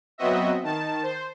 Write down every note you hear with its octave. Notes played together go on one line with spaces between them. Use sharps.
F#3 B3 C4 F#4 D#5 E5
D#3 A5
C5